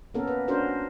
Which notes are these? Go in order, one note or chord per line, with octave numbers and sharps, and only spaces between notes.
A#3 B3 C#4 A4 A#4
B4
C#4 D4 F#4 A#4 C5